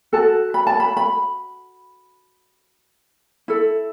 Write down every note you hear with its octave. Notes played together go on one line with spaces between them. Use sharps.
F#4 A4 A5
B5
A5
B5
B5
E4 A4